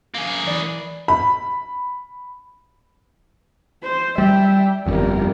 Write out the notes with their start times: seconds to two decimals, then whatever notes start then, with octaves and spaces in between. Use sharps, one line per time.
0.15 A#3 G#4
0.46 E3 D5
1.08 B5
3.83 C5
4.18 G3 E5 G5
4.86 G1 F2 G3 A#4